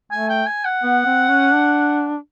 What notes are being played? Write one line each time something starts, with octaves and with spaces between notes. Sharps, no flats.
A3 G#5
G5
G#5
F#5
B3
C4
C#4
D4